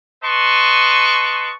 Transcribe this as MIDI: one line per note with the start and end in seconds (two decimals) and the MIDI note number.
0.24 1.52 71
0.24 1.52 75
0.24 1.52 81
0.24 1.52 84
0.24 1.52 85